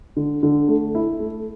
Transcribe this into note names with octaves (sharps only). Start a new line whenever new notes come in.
D3
D3
A3
E4
A3